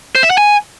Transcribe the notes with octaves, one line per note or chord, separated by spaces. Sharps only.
C5
E5
F#5
G#5